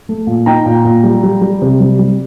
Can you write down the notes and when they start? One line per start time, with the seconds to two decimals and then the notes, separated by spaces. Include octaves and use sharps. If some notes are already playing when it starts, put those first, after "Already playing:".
0.09 A3
0.27 A#2
0.46 D#4 G5 A#5
0.66 A#2
0.85 A#2
1.04 G3
1.23 G3
1.42 G3
1.62 C3
1.80 G3
1.99 G3